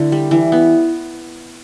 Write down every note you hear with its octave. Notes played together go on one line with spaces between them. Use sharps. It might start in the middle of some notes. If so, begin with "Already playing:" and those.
Already playing: D3 A3 E4
G3
E3
B3